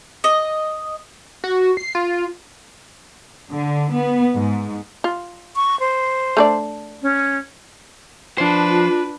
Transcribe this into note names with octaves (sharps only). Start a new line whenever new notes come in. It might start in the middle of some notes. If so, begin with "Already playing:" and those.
D#5
F#4
C7
F4
D3
B3
G#2
F4
C#6
C5
A3 D4 D5
C#4
F3 D4 B4 C5
F4